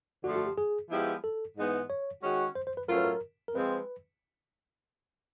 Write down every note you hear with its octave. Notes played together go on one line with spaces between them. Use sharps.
D3 F3 A3 F#4
F#4
G4
G#4
F3 G#3 B3 E4 G4
A4
G#2 E3 G#3 B3 D#4
C#5
D#3 G#3 C#4 F#4
C5
C5
B4
A2 F#3 A3 C#4 F4 A#4
B4
A#4
A#4
F3 G#3 C4 B4